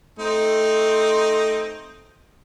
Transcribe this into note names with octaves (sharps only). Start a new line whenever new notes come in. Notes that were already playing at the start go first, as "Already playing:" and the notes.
A3 C4 D#4